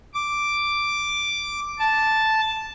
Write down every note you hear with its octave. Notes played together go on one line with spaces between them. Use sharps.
D6
A5